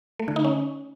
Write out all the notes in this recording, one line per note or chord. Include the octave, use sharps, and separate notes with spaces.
A3
D3
D#4
C#4